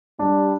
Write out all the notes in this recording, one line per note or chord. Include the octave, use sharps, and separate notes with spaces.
G3 D4